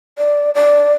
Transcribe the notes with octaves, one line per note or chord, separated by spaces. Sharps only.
D5
D5